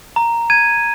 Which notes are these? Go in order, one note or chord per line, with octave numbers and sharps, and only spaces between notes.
A#5
G#6 D#7